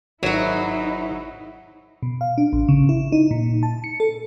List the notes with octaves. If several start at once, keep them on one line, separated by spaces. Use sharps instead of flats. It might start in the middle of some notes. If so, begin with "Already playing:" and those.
G#1 F#3 D#4 E4 F#4 C#5 E5
B2
F5
D4
A1
C#3
E4
D#4
A#2
A5
C#7
A4